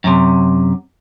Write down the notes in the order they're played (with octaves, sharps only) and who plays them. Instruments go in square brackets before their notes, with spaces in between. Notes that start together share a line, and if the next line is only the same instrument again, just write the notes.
[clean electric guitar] F#2 C3